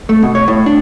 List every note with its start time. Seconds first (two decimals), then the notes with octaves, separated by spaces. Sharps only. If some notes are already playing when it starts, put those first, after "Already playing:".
0.09 A3
0.23 B2
0.35 C#5
0.48 A2
0.66 D4